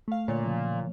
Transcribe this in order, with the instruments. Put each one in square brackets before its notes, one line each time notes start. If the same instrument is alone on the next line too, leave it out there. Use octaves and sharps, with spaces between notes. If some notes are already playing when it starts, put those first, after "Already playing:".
[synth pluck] A3 F5
[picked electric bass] A#2 [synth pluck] D3 C#5
[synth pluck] C#3 E3 F3